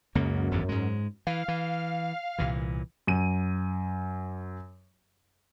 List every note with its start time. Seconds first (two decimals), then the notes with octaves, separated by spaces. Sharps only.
0.15 C#2 F#2 C#3 A#3
0.51 G#1 E2 G2
0.69 G#2 G#3
1.27 E3 F5
1.48 E3
2.38 C2 A#2 E3
3.07 F#2 D#7